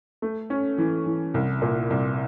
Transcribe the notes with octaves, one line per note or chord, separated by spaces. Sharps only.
A3
C#4
E3
E3
C2
A#2
C2